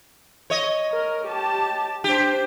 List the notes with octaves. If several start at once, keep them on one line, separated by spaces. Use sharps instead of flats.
C#5 D#5
A#4
G4 A5
D4 G4 C5